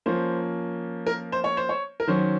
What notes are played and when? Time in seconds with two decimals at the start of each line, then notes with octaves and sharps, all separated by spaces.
0.06 F3 A#3 C#4 C5
1.07 A#4
1.32 C5
1.44 C#5
1.57 C5
1.69 C#5
2.00 A#4
2.07 D#3 F#3 C#4 C5